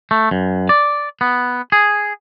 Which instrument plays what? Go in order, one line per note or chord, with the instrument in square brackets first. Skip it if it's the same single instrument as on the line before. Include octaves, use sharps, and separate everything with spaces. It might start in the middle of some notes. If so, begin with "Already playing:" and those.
[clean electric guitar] A3
F#2
D5
B3
G#4